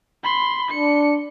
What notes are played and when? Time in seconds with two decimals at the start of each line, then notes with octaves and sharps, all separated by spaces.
0.24 B5 C6
0.71 D4 C#7